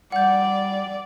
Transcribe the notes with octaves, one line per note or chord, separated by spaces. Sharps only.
G3 D5 F#5 G6